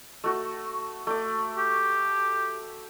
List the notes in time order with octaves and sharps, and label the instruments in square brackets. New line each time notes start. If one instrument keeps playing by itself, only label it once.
[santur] A3 F#4
A3 D6
[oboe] G4